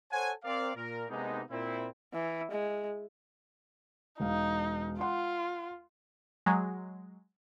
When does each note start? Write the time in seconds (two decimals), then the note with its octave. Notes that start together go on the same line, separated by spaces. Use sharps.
0.12 A4 C5 C#5 F#5 G#5
0.44 C4 A#4 D5 F5
0.76 A#2 A#4
1.09 C3 G#3 A#3 B3 D4 D#4
1.51 A#2 C4 E4
2.13 E3
2.51 G#3
4.20 E1 D#4 F5
5.00 F4 F#5 C6
6.46 F#3 G#3